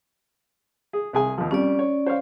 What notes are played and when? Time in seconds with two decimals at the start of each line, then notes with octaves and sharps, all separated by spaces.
0.93 G#4
1.13 C2 G#4 G#5
1.38 D#2 F3
1.51 F2 G3 C#4 D5
1.79 C#5
2.06 C5 C#5 F5